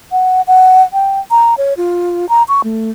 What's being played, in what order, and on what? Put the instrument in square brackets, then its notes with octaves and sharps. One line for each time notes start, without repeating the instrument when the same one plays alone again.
[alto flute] F#5
F#5
G5
A#5
C#5
F4
A#5
C#6
A3